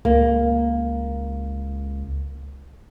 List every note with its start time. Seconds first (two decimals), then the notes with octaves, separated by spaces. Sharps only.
0.05 C#2 A#3